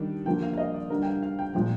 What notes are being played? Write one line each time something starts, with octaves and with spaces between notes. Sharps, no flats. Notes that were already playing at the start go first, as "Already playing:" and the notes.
Already playing: D#3 G3 D4
D3 F3 A#3 G5
F5
F5
D#5
D5
D3 G3 D4 A#4
G5
F5
F5
G5
A#2 F3 G#3 G5